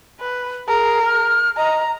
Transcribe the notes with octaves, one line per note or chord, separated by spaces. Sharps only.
B4
G#4 A#4
F6
D#5 A#5